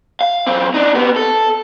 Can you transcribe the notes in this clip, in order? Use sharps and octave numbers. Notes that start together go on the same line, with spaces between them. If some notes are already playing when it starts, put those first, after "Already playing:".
F5
F#2 C4
D4 D#4
C3 B3
A4